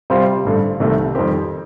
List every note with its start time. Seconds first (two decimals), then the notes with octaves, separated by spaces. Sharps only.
0.10 C3 G3 C4 F4 C5
0.44 A1 G2 D3
0.80 C2 C3 D#3 A3
1.15 F2 D#3 G3 C4 G4